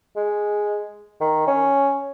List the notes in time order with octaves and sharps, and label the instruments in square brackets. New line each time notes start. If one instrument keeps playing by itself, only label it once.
[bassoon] G#3
D#3
C#4